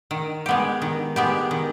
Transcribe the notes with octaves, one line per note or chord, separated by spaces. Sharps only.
D#3
G#3 B3 G4
D#3
G#3 B3 G4
D#3